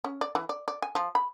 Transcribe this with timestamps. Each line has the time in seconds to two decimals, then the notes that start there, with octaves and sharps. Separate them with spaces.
0.04 C#4
0.21 D5
0.35 E3
0.49 D5
0.68 D5
0.82 G#5
0.95 F3
1.15 B5